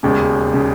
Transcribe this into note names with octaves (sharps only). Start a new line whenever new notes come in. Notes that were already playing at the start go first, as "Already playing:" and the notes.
E1 D#2 C#3
C#3